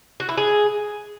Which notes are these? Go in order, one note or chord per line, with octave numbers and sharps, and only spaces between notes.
F#4
E4
G#4